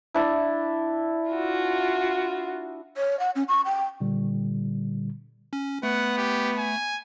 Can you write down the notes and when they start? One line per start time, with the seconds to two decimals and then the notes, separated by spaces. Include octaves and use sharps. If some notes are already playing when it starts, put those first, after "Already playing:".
0.14 D4 E4
1.31 F4 F#4
2.97 C#5
3.20 F#5
3.35 C#4
3.49 C#6
3.65 G5
4.00 A#2 D3 G3
5.53 C#4
5.83 A3 B3 F#5
6.18 G4
6.58 G#5